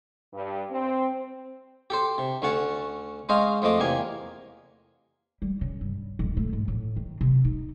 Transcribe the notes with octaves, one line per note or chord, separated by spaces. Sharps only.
G2
C4
G4 A4 C5
C3
D2 A3 C#4 F#5 A5
G#3 C#4 C5 D#5 F5
F2 F3 A3 D#5 D6
E2 C3 A#3 G#5
G3
C#3
G2
D#1
A3
G#2
A2
D#3
C3
D#4